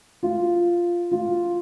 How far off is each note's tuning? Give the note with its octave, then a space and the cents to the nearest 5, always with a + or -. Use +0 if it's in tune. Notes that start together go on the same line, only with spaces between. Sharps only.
F4 -5
F4 +0